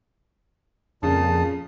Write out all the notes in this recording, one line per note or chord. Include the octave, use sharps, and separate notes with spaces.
F2 A#2 C#3 A5 D#6